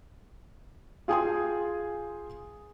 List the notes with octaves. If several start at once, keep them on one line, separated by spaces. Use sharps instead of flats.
F4 G#4 G5 G#5 C6 D#6